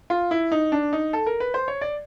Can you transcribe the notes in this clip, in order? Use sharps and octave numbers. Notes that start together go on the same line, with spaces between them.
F4
E4
D#4
D4
D#4
A4
A#4
B4
C5
C#5
D5